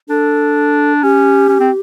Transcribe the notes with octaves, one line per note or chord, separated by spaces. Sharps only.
D4 A4
C#4 G4
C#4
C4